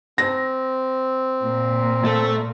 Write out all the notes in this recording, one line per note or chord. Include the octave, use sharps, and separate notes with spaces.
C4 A#6
A#2 A#3
A3